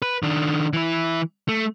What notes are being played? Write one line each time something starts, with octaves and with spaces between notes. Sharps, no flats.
B4
D#3 D4
E3 E4
A3